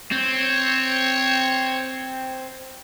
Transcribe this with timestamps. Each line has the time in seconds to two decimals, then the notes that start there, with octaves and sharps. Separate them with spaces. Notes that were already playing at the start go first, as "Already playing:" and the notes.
0.12 C4 C#5